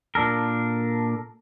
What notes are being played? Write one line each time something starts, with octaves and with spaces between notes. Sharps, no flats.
A#2 D4 A4 A#4